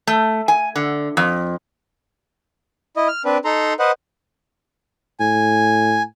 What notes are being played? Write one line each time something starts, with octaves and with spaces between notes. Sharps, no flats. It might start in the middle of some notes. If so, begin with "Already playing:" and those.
A3
G#5
D3
F2
E4 D#5
F6
C4 D4 B4
D#4 A4 A#5 C6
B4 C5 D#5 F#5
A2 G#5